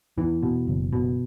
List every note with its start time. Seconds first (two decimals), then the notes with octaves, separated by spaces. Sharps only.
0.18 E2 E3
0.43 B2
0.67 F#1
0.93 B2